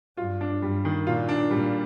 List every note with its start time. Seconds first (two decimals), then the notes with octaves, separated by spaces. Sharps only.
0.17 G2 F4
0.41 D4
0.62 G2 G3
0.85 D#3
1.07 A#2 F4
1.29 D4
1.51 A#2 G3